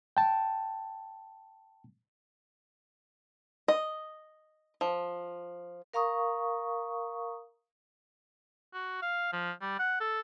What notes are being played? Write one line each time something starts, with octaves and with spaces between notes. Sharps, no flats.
G5 A5
D#5
F3
A#4 F5 A#5 C#6 D#6
F#4
F5
F3
G3
F#5
A4